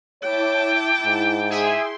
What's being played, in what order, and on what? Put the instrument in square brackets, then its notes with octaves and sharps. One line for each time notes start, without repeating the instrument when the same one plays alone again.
[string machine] E4 A5 D6 [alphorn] C#5 [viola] G5
[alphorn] G#2
[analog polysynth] G#4 E5 G#5 [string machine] C6